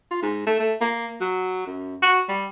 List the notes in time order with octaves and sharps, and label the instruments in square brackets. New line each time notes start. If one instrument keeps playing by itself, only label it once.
[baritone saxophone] F4
G#2
A3
A3
A#3
F#3
F#2
F#4
G3